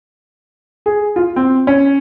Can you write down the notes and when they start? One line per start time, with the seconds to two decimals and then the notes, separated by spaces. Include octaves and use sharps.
0.86 G#4
1.16 F4
1.36 C4
1.67 C#4